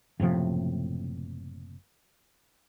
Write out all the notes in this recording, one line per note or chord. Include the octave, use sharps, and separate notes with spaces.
F#1 A2 C3 F3